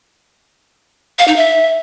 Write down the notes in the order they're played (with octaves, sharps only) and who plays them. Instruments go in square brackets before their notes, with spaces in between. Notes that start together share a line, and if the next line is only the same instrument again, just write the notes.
[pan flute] F5
D#4
E5